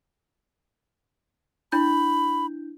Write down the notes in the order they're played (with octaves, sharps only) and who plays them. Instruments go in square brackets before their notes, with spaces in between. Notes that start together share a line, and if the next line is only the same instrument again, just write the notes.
[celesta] D4 E4 G6 [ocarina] B5